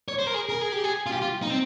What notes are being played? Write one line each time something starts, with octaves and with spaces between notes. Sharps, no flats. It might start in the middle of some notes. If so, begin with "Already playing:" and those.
C#5
C5
A#4
G#4
A#4
G#4
G4
G#4
F4
G4
F4
D#4
C4